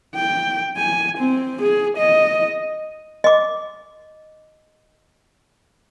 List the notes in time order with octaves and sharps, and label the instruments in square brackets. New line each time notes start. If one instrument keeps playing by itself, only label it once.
[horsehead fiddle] G5
G#5
C4
G#4
D#5
[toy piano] D#5 D6